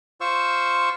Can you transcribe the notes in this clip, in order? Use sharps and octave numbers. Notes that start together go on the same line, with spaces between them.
F4 C5 C#6 E6